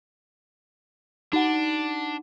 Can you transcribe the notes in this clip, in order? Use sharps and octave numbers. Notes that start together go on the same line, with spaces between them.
D4 D#4 F#5